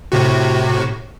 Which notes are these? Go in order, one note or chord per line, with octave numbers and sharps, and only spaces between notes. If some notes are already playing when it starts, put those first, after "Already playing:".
A2 C3 F#4